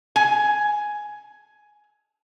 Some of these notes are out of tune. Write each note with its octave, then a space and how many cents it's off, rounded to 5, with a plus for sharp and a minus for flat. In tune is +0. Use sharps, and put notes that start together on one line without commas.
G#5 +5